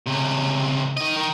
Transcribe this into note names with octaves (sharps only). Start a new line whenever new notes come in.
C#2 C3
D#3 D#5
D#3